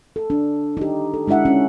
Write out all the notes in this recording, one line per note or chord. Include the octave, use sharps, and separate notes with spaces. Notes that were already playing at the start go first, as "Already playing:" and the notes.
A4
D4
D#4 G4
A4
G#3 D4 E4 E5 F#5
C#4